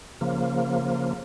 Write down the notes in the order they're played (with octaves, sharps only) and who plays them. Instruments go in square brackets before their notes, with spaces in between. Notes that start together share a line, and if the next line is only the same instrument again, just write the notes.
[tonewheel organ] C#3 F3 A#3